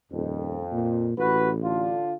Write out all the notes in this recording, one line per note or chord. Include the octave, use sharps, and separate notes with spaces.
D#1 F2
A#2
A1 F#4 B4
D3 D4 F4